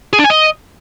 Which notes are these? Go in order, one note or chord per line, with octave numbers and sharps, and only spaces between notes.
G#4
D4
G#5
D#5